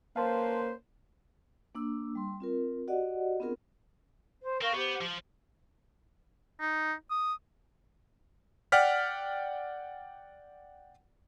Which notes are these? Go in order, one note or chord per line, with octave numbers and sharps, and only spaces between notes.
A#3 C#4 B4 C5 F5 A5 C6
A#3 D4 E6
G3 C6
C4 F4 A#4
F#4 G4 D5 D#5 F#5
B3 C4 D4 F4 G#4 A#4
C5
C4 A#4 F5 C#6
B3 G4 C5
F3
D#4
D#6
D5 F#5 G5 F6 B6